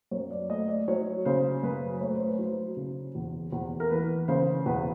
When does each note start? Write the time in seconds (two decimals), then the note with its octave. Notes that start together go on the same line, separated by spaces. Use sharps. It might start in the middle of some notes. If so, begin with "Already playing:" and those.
0.11 F#2 C#5
0.31 D5
0.49 A3 D#5
0.68 D5
0.88 F#3 C#5
1.25 C#3 C5
1.63 F#2 B4
2.01 A3 C#5
2.14 C5
2.27 B4
2.39 F#3 C5
2.77 C#3
3.15 E2
3.52 E2
3.80 A#4
3.90 E3 B4
4.28 C#3 C5
4.66 E2 B4